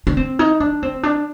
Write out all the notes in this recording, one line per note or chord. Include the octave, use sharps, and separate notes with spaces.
D4
C4
D#4
D4
C4
D4